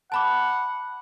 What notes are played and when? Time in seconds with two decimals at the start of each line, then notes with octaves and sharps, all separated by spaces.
0.12 F#5 A5 B5 D6